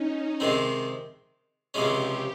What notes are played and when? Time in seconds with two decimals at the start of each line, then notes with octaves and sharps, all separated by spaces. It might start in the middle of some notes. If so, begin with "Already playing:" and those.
Already playing: C#4 D#4
0.40 C3 D#3 G#3 C4
1.74 C#2 C3 F3 G#3 C#4 G4